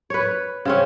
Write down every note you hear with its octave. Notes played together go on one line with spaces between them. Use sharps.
B4 C#5
C#3 C4 C#4